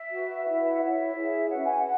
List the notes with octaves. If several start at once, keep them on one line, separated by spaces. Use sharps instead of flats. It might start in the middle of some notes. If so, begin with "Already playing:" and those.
Already playing: E5
F#4 B4
E4 B4
F#5
E4 C#5 E5
E4 G#4 C#5
C#4 F#4 B4 F#5
G#5
F#5